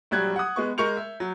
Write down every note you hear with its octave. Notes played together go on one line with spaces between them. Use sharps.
A#1 F#3 G3 F#6 G#6
F#5 D#6
G#3 B3 C#6
G#3 A#4 C#6 G6 C#7 F7
E5
F#3